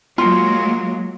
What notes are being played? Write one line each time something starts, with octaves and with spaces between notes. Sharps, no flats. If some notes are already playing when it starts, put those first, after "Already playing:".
F#3 G#3 A#3 F4